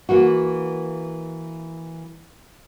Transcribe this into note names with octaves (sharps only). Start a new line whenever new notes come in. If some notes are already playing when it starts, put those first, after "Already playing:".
E3 A#3 F#4